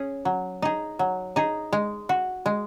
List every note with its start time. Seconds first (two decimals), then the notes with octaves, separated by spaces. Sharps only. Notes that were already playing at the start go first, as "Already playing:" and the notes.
Already playing: C#4 G#4
0.25 F#3
0.62 D#4 G#4
0.99 F#3
1.36 D#4 G#4
1.73 G#3
2.09 F#4
2.46 G#3